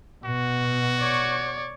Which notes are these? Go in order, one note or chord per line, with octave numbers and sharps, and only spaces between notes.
B2 F#4
C#5 D5